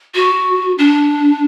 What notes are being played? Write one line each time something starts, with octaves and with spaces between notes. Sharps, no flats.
F#4
D4